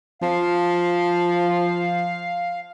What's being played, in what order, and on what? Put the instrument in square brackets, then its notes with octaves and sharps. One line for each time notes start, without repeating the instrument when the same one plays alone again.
[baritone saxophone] F3 [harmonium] F5